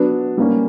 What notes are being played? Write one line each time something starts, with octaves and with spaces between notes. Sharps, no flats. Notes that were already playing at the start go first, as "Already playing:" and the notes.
Already playing: F#3 B3 D4
G3 A#3 C#4